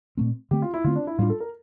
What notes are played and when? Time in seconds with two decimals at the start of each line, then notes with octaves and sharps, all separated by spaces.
0.17 A#2 A3 C4
0.51 D3 A3 C4 G4
0.62 F4
0.74 E4
0.84 D3 A3 C4 F4
0.96 D4
1.07 E4
1.18 A2 G3 A#3 D4 F4
1.30 A4
1.40 A#4